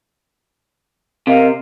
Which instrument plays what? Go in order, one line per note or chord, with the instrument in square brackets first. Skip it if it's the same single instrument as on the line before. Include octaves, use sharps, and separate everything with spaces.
[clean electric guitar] C3 [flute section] A#4 D#5 F5